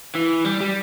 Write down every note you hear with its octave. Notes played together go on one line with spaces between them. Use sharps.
E3
G3
G3